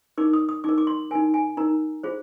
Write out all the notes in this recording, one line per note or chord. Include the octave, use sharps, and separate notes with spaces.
D#4 A#4 D6
D#6
D#6
D#4 A#4 D6
D6
C6
D#4 A#4 G#5
G#5
D#4 A#4 A#5
F4 G#4 C5